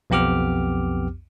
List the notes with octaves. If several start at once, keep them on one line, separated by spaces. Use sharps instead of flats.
B1 F2 B3 G4 D6 F6